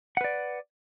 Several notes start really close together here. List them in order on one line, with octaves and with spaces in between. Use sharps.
F#5 B4 D5